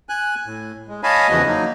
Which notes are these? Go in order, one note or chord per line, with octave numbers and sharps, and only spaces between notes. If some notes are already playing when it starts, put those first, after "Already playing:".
G#5 F#6
A2
G#3
C#5 D#5 F5 G#5 A5 B5
E2 C#3 E3 F3 F#4 D#5
F#3 A#3 D#4